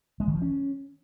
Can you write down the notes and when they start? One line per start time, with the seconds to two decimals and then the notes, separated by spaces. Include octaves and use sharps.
0.20 G#3
0.27 D#3
0.35 F3
0.42 C#4